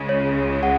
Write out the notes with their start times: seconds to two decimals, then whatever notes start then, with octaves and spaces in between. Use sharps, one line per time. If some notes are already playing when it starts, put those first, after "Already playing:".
Already playing: C#2 C#3 G#3
0.09 C#5
0.63 F#5